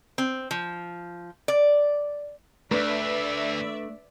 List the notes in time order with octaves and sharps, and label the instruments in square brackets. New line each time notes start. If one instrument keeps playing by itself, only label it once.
[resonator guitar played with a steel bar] C4
F3
D5
[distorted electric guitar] D2 [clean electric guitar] A3 D4 [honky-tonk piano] B4 [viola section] D5 E5